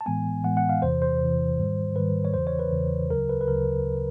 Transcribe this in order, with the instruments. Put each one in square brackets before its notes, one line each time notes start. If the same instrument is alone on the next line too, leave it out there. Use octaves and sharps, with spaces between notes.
[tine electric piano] A5
A2 E3 G#3 B3 G#5
A2 E3 G#3 B3 F#5
F#5
F5
E2 C3 E3 C5
C5
E2 C3 E3
G#2 D#3 G3
G#2 D#3 G3 B4
C#5
E2 C#3 E3 C5
C#5
B4
E2 C#3 E3
D2 C#3 F#3 A#4
B4
B4
D2 C#3 F#3 A#4